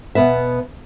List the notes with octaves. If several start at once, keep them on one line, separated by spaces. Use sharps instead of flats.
B2 B3 B4 E5